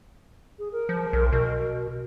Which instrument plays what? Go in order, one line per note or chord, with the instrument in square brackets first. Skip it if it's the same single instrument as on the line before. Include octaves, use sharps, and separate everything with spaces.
[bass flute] G#4
A#4
[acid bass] F3
B1
B2